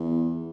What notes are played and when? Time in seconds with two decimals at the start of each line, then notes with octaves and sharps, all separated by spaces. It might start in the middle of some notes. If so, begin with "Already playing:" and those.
Already playing: E2